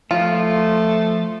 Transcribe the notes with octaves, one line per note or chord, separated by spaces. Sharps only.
F3 A3 F4